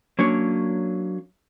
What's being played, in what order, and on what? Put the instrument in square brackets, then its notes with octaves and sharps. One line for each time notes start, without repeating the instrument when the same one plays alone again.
[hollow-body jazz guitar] F#3 A#3 C#4 D4 C#5